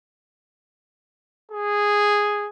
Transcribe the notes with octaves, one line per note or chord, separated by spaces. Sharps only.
G#4